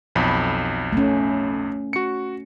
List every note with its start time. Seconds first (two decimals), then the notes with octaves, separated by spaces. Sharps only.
0.15 B1 F2 B5
0.93 A3 C#4
1.93 F#4 C#7